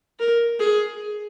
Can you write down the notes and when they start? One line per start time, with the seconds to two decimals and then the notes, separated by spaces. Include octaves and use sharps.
0.19 A#4
0.60 G#4